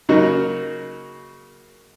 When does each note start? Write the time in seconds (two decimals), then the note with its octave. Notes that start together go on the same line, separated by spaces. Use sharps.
0.09 C#3 F#3 A#3 D#4 F#4